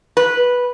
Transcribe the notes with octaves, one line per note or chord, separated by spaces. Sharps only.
B4